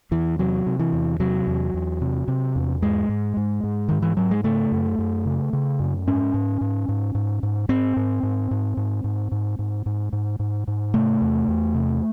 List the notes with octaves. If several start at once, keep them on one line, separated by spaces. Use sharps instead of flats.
E2 E3
C3 F#3
C3
E3
E2
C3 F#3
E2
E2
C3
C3
E2
G#2 G#3
G#2
G#2
G#2
G#2 D#3
E3
G#2 F#3
G#3
C#3 A3
F#2
F#2
C#3
C#3
F#2
G#2 C#4
G#2
G#2
G#2
G#2
G#2
G#2 C4
G#2
G#2
G#2
G#2
G#2
G#2
G#2
G#2
G#2
G#2
G#2
C3 A3
E2
E2
C3